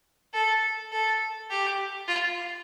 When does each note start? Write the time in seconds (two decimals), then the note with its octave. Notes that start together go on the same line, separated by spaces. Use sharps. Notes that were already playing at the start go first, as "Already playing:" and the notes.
0.33 A4
0.92 A4
1.50 G4
2.08 F4